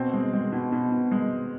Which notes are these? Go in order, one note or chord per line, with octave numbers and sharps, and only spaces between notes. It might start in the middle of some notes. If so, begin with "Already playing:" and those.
Already playing: B2 C4
G#3
G#3
B2
B2
B2
G#3